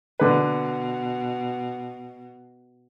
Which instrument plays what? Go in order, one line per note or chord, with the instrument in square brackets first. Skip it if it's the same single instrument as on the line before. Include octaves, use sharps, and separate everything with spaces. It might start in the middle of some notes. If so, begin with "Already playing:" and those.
[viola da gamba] B2 [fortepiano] D3 B4